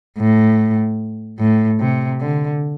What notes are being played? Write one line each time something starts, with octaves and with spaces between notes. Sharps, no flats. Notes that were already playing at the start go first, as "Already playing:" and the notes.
A2
A2
C3
D3